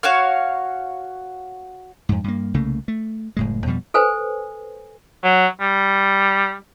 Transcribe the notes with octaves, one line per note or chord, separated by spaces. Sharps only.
F#4 C#5 F5 F6
F2 G#2
G2 A#3
C2 C#3 A3 A#3
A3
F#1 A2 G#3
F2 B2 F3 G3
A4 B4 C5 G#5
F#3
G3